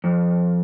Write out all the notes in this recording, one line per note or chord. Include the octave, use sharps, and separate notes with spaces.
F2